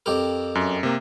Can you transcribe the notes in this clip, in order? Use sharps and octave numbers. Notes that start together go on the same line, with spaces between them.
F2 G4 A#4
F#2
C3 A#3